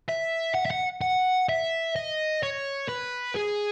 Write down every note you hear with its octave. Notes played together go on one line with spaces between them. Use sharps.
E5
F#5
E5
F#5
F#5
E5
D#5
C#5
B4
G#4